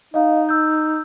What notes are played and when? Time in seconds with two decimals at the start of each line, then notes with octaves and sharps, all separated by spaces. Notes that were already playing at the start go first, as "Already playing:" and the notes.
0.14 D#4 D#5 F5
0.49 E6 G6